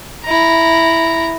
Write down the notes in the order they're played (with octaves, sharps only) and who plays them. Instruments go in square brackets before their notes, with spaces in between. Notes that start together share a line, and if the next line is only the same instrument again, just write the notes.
[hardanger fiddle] E4 A#5